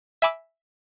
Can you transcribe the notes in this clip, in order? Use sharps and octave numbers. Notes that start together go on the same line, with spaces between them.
E5 G#5 B5 D6 E6